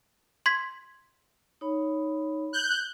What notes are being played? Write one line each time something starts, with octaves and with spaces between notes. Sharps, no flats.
C6 G#6 B6
D#4 C#5 B5
F#6 G6